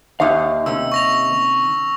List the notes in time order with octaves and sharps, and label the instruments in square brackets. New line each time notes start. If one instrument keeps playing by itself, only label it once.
[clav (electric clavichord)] D#2 [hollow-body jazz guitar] D#4 F5 [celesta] E5
[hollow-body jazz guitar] C3 D#3 C#4 [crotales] E6
[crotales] C#6 A#6 F7